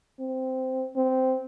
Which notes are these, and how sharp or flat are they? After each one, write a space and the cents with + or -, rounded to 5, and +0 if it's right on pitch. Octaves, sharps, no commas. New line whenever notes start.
C4 -10
C4 -10